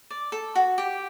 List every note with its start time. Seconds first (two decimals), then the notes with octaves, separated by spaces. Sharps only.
0.10 D5
0.32 A4
0.55 F#4
0.78 G4